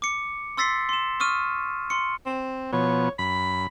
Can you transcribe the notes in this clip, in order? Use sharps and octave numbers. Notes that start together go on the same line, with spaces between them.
D6 C#7
C6 E6 A6 B6 C7
C6 E7
C#6 D#6 F6 D#7
C6 C#7
C4
B2 F3 B3 C#5
F#2 B5